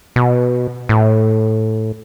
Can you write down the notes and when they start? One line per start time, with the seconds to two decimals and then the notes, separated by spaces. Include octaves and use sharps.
0.16 B2
0.89 A2